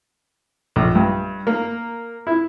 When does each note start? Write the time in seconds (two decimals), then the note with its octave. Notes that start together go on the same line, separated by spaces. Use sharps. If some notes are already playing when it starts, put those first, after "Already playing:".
0.76 A#1
0.95 G2
1.47 A#3
2.27 E4